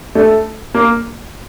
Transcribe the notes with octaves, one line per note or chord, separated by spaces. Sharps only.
A3
A#3